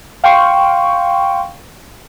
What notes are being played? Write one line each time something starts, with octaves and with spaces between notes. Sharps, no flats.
F5 G5 C6 C#6